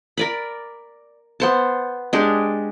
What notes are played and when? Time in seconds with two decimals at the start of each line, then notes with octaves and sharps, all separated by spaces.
0.17 A#4 D5 B5
1.40 B3 C5 A5
2.13 G#3 D4 G4